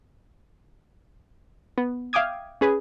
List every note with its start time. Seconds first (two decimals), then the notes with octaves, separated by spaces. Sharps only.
1.78 B3
2.13 E5 F5 G5 D6 D#6 G#6
2.61 C#4 G#4 B4